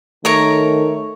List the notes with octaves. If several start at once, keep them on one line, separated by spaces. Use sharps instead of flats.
D#3 A3 A#4 C#5 A#5